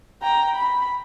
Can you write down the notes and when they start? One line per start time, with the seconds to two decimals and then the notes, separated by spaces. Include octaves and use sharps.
0.23 G5 A#5
0.56 B5